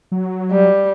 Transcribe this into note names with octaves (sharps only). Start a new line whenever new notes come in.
F#3
G3